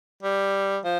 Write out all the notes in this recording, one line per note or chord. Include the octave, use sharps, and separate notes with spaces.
G3
F3